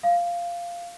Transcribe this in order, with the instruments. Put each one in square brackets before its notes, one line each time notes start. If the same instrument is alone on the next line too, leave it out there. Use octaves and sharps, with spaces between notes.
[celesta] F5